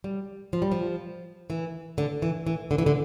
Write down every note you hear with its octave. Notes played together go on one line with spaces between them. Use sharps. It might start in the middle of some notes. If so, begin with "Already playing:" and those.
G3
F3
G3
F3
E3
D3
E3
E3
D3
E3
D3